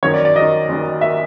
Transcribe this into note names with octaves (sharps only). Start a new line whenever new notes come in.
F#1 F#2 D#3 C#5
D5
D5
F#1 F#2 D#3 D#5
F#1 F#2 D#3
D#3 E5